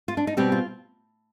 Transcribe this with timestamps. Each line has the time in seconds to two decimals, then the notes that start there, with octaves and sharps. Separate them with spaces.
0.08 F4
0.17 D4
0.27 D#4
0.37 B2 G3 C4 G4
0.52 F4